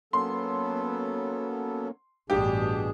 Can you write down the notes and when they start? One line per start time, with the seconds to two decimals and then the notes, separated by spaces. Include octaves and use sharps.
0.13 F#3 A#3 B3 C#4 A4 C6
2.30 A1 G2 B2 G3 D4 G4 G#4